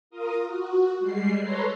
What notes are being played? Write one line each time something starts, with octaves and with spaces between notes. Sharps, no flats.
F4 A#4 D#6
F#4
G3 G#3 C7
A4 B4 C#5 A#5 C6